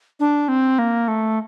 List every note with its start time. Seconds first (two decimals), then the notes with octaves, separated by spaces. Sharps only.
0.20 D4
0.48 C4
0.79 A#3
1.08 A3